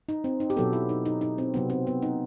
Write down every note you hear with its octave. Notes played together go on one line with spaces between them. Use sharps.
D#4
C4
D#4
G4
B2 F#3 B3 A4
E4
D#4
D#4
D#4
C4
C3 F#3 B3
C4
B3
D#4